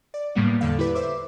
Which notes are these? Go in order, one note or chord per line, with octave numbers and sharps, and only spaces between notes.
D5
A2 C#3 G3 A#3 B3
E2 D3 A4 F5
E4 G4 B4 D5
C5 E5 D6